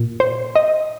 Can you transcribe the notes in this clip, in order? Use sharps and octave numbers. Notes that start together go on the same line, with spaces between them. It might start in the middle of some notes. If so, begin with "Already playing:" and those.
Already playing: A#2
C5
D#5